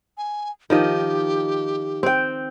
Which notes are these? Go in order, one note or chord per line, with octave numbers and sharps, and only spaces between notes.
G#5
D#3 F3 G4 D#5
C4 G5